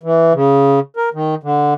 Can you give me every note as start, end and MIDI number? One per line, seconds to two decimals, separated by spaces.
0.03 0.33 52
0.34 0.80 49
0.97 1.09 70
1.14 1.35 51
1.43 1.74 50